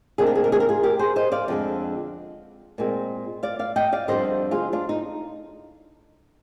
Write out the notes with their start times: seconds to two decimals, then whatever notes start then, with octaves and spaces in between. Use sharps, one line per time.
0.18 C3 D#3 A#3 D4 G#4
0.26 A#4
0.35 G#4
0.44 A#4
0.52 G#4
0.60 A#4
0.69 F4 G#4
0.83 G4 A#4
0.99 G#4 C5
1.16 C5 D#5
1.32 D5 F5
1.48 F2 D3 G#3
2.78 A#2 G#3 C4
3.43 D5 F5
3.59 D5 F5
3.76 D#5 G5
3.92 D5 F5
4.08 F2 D3 G3 C5 D#5
4.51 F4 G#4
4.73 D4 F4
4.89 D#4